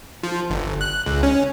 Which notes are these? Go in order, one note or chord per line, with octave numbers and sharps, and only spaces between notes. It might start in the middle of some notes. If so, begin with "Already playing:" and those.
F3
G1
F#6
C#2
C#4